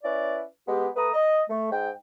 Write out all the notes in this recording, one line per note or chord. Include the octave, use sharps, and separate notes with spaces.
C#4 E4 B4 D5
G#3 B3 G4
A3 B4 A#5 D#6
D#5
A3
G#2 G5